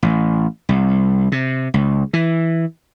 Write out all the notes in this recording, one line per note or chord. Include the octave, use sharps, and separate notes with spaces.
A1
C2
C3
C#2
E3